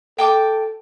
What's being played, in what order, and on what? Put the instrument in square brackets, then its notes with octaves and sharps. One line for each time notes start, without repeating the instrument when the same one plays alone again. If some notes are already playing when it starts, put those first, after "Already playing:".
[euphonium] A4 [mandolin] G5 A5 D6